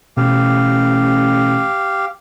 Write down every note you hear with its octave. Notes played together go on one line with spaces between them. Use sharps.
A1 B2 G4 F5